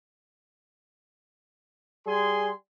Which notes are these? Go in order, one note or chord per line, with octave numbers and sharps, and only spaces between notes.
G3 G#4 G#5 C6